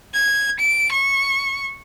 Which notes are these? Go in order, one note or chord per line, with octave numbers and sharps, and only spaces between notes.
G#6
D7
C#6